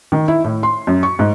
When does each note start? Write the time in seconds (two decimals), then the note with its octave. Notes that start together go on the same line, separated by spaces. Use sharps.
0.12 D#3
0.28 E4
0.44 A2
0.63 C6
0.87 F#2
1.03 C#6
1.19 G#2